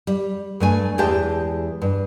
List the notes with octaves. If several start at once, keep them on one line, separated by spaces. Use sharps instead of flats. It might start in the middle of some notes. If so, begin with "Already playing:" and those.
G3
G2 A3 G#5
E2 E3 G#3 G4 G5 A5
G2